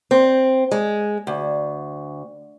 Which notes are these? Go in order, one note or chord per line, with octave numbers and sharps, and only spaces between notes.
C4
G#3
D2